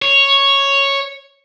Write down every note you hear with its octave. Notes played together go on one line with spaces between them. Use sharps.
C#5